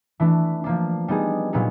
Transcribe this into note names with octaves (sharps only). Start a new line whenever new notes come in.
E3 A3 D4
F3 A#3 D4
G3 B3 D#4 G#4
A#2 F#3 B3 D#4 G#4